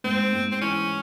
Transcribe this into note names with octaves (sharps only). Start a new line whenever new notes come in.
G#2 C4
G#2
C4
E3 C#4